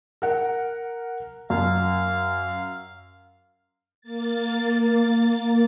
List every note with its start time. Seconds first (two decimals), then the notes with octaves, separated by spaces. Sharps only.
0.22 A#4 F#5
1.50 F#2 F5
4.01 A#3 A6